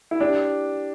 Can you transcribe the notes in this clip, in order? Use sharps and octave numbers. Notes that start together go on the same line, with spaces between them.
E4
D4 G4